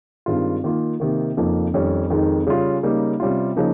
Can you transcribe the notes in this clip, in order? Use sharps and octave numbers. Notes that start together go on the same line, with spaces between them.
G2 D#3 G#3 C4 F4
D#3 A#3 F4
C3 D#3 A#3
F2 C#3 F3 A#3 D#4
F2 D#3 G3 C#4
F2 D#3 G#3 D#4
C#3 G3 C#4 F4
C#3 G3 A#3 D#4
C3 G3 C#4 F4
C#3 F3 A#3 D#4